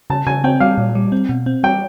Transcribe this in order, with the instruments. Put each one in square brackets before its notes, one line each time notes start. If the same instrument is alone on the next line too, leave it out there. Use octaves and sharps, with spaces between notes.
[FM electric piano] C#3 [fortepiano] A5
[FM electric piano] C#3 [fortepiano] G#5
[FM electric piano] C4 [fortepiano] G5
[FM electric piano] G3 [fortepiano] F5
[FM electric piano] A#2
G3
C4
B2
C4
[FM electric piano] G3 [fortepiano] G5